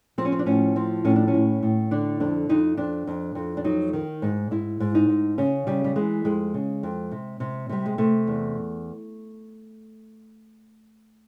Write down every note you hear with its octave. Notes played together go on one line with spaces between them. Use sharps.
F3 C4
C#4
C4
D4
A2 C#4
F3 C4
A2 C#4
D4
C#4
A2
A2
D3 D4
F2 D4
F2 D#4
F2 D4
F2
F2
D4
F#3 D#4
D#3
G#2
G#2 E4
G#2
D#4
G#2
C#3 C#4
C#3 G3
G3
E3 G#3
F2 G#3
C#3
F2
C3
C3
C3 G3
G#3
C3 A3
E2